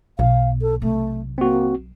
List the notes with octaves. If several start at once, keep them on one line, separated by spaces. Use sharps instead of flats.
B1 B2 F5
A4
C3 A3
A#3 C4 F#4